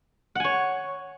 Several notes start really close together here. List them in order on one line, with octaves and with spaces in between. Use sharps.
F#5 G#5 C#5